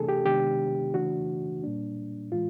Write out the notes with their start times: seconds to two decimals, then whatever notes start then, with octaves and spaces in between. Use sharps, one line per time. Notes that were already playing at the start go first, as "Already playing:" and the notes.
Already playing: C3 E3 A3 D4 G#4 A4
0.09 G4
0.25 C3 D#3 G#3 B3 D4 G4
0.94 C#3 E3 A3 D4 F#4
1.64 A#2 G3 A#3 D4
2.32 A2 E3 G#3 F4